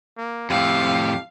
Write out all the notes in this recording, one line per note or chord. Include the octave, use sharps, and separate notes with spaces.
A#3
F2 A2 G4 F5